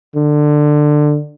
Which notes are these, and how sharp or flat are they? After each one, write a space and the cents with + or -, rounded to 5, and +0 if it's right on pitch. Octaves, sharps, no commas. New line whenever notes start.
D3 +20